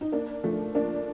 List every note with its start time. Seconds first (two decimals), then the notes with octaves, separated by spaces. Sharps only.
0.01 D#4
0.12 A#3 D4
0.44 F3 A3
0.75 A#3 D4